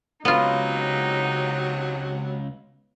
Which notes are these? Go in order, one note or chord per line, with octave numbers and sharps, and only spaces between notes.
C#2 C3 F#3 B3 D#4 F4